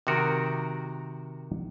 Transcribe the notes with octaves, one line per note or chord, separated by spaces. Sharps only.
C3 D#3 F#4 A#4